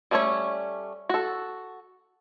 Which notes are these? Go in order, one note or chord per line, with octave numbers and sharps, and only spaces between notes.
G3 A3 C#4 E4 C#5
F#4 A4